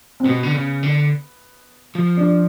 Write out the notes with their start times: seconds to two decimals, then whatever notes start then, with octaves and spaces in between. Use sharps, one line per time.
0.20 C4
0.25 B2 B3
0.43 D3
0.54 C#3
0.83 D3
1.95 F3
2.17 D4